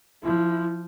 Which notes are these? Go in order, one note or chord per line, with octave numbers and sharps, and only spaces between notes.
F3 E4